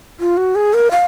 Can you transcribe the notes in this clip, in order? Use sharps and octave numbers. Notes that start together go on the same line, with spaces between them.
F4
F#4
G#4
A#4
F5